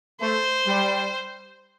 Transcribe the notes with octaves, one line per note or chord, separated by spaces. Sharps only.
A3 C5
G3